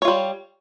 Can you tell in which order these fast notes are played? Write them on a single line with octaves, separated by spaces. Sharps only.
C#5 F4 G3